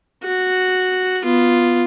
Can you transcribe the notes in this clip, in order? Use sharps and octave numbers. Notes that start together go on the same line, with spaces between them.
F#4
B3 F4